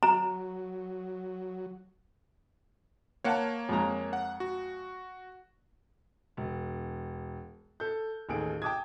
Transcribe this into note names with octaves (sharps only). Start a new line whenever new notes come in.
F#3 A#5
A#3 C#5 F5 F#5 A5
F2 G#3 A#5
F#5
F#4
E1
A4 G6
A1 D#2 G#4 A4 D7
G5 A5 D6 D#6 G#6